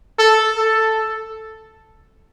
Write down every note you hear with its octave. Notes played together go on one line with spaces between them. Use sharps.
A4
A4